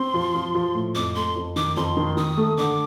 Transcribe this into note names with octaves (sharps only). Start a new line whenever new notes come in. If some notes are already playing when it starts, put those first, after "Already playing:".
Already playing: C4 C6
F3
F3
F3
A2
F2 D6
A3 C6
F2
D#3 D6
F2 C6
D#3
D#3 D#6
A3
D3 D6